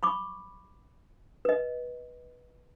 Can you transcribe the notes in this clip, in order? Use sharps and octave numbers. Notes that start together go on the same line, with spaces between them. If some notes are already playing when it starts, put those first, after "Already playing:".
B5 C#6 D6
B4 D#5